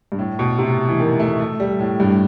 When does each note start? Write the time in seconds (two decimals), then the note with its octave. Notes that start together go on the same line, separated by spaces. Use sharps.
0.12 G2
0.19 A2
0.39 B2
0.58 C3
0.89 E3
1.00 D#3
1.20 A3
1.40 A3
1.60 G3
1.79 A2
2.00 G2